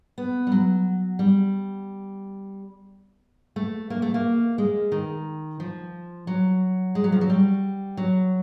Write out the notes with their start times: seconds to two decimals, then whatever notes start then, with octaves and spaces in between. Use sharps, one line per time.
0.18 B3
0.47 G3
0.52 F#3
1.19 G3
3.56 A3
3.90 A#3
4.02 A3
4.14 A#3
4.58 G#3
4.92 D#3
5.60 F3
6.27 F#3
6.95 G#3
7.04 F#3
7.12 F3
7.21 F#3
7.30 G3
7.97 F#3